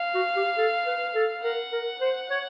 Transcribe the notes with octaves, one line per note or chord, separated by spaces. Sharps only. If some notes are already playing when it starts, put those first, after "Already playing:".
Already playing: F5
F#4
G4
A4
B4
A4
A#4 F#5
A#4
C5
C#5